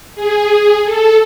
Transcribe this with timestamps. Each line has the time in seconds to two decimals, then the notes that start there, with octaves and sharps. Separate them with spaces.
0.15 G#4
0.84 A4